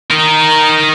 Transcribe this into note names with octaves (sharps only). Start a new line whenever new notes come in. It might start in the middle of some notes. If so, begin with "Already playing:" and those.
D#4 A#4